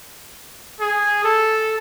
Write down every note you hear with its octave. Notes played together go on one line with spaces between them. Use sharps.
G#4
A4